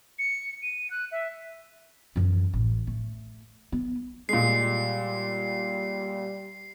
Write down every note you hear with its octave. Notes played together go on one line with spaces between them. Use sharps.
C#7
D#7
F#6
E5
F#2 E3
A1
A3
B3
A#2 G3 G#3 C7